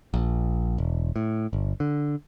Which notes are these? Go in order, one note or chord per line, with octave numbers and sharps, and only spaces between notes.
A#1
E1
A2
G1
D3